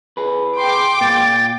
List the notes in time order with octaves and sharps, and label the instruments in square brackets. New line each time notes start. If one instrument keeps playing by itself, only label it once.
[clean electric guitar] G#4 B4
[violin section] G5 D6 [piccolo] C6
[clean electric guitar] A#2 [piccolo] A6